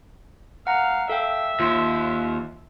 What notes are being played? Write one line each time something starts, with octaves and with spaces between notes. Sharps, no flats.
F5 F#5 A#5
A4 E5 F5 G5
D#2 F4 C6